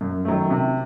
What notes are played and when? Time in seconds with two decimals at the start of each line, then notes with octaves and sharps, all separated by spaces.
0.01 F#2
0.25 D#3 F#3 A3
0.50 C3